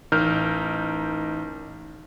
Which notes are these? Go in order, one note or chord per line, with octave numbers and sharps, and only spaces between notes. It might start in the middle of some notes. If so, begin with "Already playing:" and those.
A1 D#4 A#4 F6 G6